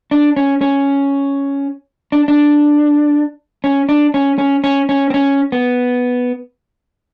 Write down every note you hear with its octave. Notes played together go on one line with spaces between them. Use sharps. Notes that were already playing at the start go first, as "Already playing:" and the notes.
D4
C#4
C#4
D4
D4
C#4
D4
C#4
C#4
C#4
C#4
C4
C#4
B3